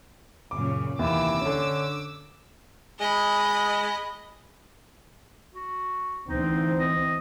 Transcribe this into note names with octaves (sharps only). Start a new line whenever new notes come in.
F#2 A#2 C#3 D6
D#2 C3 E3 D6 E6
D3 C#4
G#3 D#5 B5
F#4
D2 E3 C4 D#4
D#5